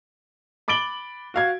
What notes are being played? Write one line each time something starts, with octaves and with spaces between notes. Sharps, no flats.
B5 D6 A6 D7 F#7 G7
F#4 F5 G#6